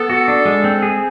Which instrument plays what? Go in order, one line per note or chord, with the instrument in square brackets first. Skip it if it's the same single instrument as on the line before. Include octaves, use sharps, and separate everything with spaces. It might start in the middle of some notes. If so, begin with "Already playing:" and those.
Already playing: [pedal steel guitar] B3 [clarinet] A4
[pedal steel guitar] F#4
D4
G#3
C4
G#4